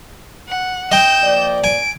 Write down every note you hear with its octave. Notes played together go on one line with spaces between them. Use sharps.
F#5
D#5 G5 G6 E7
F3 A#3 D5
G#5 D7